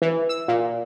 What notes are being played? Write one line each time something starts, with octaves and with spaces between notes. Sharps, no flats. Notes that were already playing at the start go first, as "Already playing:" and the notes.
E3
E6
A#2